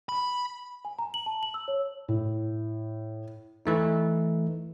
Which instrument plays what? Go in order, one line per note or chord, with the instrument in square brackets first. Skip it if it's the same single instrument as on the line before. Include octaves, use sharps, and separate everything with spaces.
[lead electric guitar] B5
[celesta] G#5
A#5
F#7
A5
F#7
E6
C#5
[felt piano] A2
[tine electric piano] E3 A3 D#4